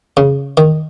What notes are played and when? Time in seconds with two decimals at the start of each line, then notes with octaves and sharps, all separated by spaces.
0.17 C#3
0.57 D#3